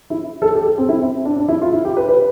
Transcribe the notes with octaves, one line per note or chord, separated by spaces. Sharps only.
E4
A4
G4
A4
C4
E4
C4
D4
D4
E4
F4
E4
G4
B4
B4